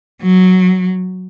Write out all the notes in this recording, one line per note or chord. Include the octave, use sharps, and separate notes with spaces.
F#3